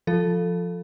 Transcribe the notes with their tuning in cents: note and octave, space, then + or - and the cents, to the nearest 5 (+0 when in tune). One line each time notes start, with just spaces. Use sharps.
F3 +0 A4 +0